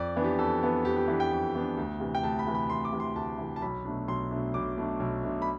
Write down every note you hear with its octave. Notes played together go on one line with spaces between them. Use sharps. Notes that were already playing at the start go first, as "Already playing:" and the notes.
Already playing: F2 D5
E3 B3 D4
G4
F2 A4
E3 B3 D4
F2 G4
G4
E3 B3 D4
G5
F2
E3 B3 D4
D2
C3 E3
G5
D2 A5
B5
C3 E3
B5
D2 C6
D6
C3 E3
C6
D2 A5
C3 E3
A5
B1 B5
B2 A3 D4
B1 C6
B2 A3 D4
B1 D6
B2 A3 D4
B1
B2 A3 D4
B5